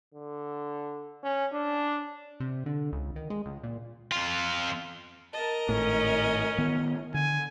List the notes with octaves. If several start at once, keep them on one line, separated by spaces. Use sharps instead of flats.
D3
C#4
D4
C3
D3
C#2
D#3
G#3
C#2
A#2
F2 F4
A#4 D#5 A5
G#1 A2 C#4
D#3 B3
D3 G#5